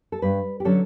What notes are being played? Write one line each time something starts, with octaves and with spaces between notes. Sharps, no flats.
A4
G2 B4
G4
D3 F#3 C#4 A4